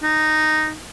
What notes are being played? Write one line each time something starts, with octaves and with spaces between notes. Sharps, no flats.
D#4